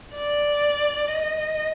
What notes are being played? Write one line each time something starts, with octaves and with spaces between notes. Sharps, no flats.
D5
D#5